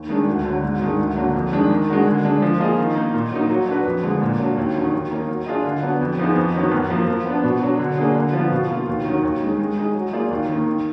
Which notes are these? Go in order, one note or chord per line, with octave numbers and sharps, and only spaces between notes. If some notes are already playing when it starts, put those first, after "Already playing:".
Already playing: D#2
D#3 G#3 D4
D2
D3 F#3
G#2
D#3 G#3 D4
D2
D3 F#3 A#3 D4
F2
D#3 G#3 D4
D#3
G#3 D4 F#4 A#4
D3
G#3 D4
F3
A#3 F4 G#4 D#5
D#3
A#3 D#4
A#2
F#3 A#3 D#4
F#3
D4 F#4 B4
F2
D3 F3 G#3
A#2
F#3 D4
D#2
D#3 F#3 D4
D#2
D#3 A#3
F#3
D4 F4 G#4 D#5
D3
F#3 B3 D4
F2
F3 B3 D#4 G#4
F2
D#3 F#3 B3
F#2
F3 A#3
F3
B3 D4
B2
F#3 D4
D3
F#3 A#3 D4 G#4
D3
F3 B3 F4
B2
A#3 F4
D#2
D#3 F#3
D#2
D#3 G#3
G#3
D#4 G#4 D#5
F#3
A#3 F4 G#4 D5
D#2
D#3 A#3
D#3